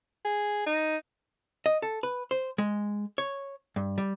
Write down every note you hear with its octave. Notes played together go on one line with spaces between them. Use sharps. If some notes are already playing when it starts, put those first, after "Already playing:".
G#4
D#4
D#5
A4
B4
C5
G#3
C#5
G2
G3